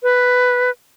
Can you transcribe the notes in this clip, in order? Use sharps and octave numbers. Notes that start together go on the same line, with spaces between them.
B4